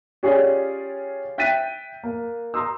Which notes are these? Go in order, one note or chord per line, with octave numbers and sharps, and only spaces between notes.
C#4 F4 G4 G#4 C#5 D5
E5 G5 F#6 A6 B6 D#7
A#3
A#5 C6 D#6 E6